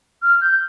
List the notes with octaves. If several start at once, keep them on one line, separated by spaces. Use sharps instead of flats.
F6
G6